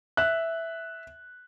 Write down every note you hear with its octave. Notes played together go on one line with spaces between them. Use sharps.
E5 F#6